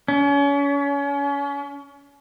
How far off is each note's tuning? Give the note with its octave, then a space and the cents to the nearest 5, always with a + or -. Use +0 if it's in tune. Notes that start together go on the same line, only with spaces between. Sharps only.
C#4 +35